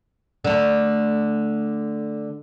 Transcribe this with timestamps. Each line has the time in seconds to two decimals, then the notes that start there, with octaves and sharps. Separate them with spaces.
0.44 D3 A3